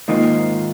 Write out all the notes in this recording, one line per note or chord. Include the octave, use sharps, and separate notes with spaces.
G#2 D#3 G#3 A#3 D#4 F4